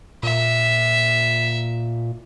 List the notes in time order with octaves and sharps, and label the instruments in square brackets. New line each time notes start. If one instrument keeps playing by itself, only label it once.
[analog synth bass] A#2 [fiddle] E5